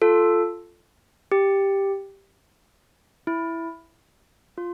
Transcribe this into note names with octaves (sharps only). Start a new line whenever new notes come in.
F4 A4
G4
E4
F4